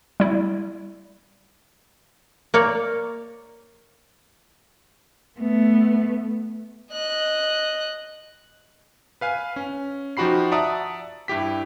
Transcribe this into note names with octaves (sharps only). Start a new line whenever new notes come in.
G3 E4
A#3 C#5 D5
A3 B3
D#5 F#6
B4 F5 G#5
C#4
F3 D#4 F#4 G4 B5 C7
D5 E5 F#5 A5 A#5 D#6
G2 E4 G4 B6